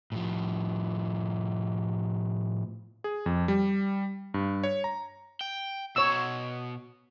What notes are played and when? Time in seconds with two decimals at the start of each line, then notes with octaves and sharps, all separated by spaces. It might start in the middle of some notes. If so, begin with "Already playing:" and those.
0.12 A2 F3
3.04 G#4
3.26 F2
3.48 G3
4.34 G2
4.64 C#5
4.84 A#5
5.41 G5
5.96 B2 C#5 A#5 E6